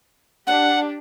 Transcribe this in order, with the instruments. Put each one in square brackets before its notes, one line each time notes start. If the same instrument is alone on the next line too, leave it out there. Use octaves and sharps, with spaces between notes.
[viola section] D4 G4 [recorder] F#5